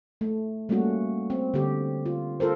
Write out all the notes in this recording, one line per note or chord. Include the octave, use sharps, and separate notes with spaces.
A3
G3 A3 A#3 C#4 F#4
C4
D3 G4
F4
F4 A4 A#4 C5